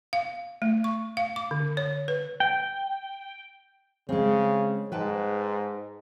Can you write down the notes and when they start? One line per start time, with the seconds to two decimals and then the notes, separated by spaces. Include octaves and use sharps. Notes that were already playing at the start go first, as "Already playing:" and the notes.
0.13 F5
0.62 A3
0.84 C#6
1.17 F5
1.36 D6
1.51 D3
1.77 C#5
2.08 B4
2.40 G5
4.09 C#3 G#3 C4
4.92 G#2 B4 G5 A5